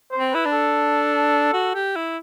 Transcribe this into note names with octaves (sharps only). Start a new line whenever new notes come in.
C5
C4
E4 B4
D4
A4
F#4
G4
E4